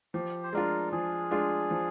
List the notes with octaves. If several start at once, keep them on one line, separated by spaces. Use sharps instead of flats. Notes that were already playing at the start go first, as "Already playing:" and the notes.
F3 G4
C5
G#3 D4 F4 A#4
F3 G#4
G#3 D4 F4
F3